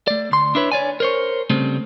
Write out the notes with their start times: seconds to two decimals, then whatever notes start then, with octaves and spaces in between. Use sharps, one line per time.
0.07 A3 D5
0.31 D2 C6
0.55 D4 E4 B4 C#5
0.72 C#5 D5 G#5
1.00 A#4 C5 C#5
1.50 C#3 G3 A3 C4